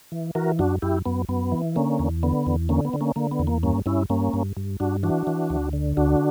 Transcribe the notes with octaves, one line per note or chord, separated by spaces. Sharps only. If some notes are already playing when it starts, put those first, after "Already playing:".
E3
E3 F#4 A#4
F#2 D4 F#4
F#2 E4 G4
F#2 B3
F#2 B3
E3
D3 A#3 C#4
E2
D3 B3
E2
D3 A#3 C#4
B3
D3
A#3 C#4
D3 A#3
B3
E2
A#3
G2 A#3 C#4
G2 C#4 E4
G2 A#3 C#4
G2
G2
G2 D4 F#4
E3 D4 F#4
E3
D2
D3
D2 D4 F#4